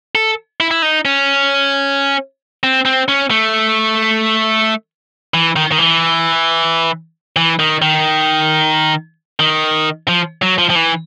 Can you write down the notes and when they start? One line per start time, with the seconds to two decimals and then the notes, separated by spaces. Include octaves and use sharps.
0.15 A4
0.60 E4
0.71 E4
0.82 D#4
1.05 C#4
2.64 C4
2.85 C4
3.08 C#4
3.30 A3
5.34 E3
5.56 D#3
5.72 D#3
5.78 E3
7.36 E3
7.59 D#3
7.82 D#3
9.40 D#3
10.08 F3
10.42 F#3
10.58 F3
10.70 F3
10.76 E3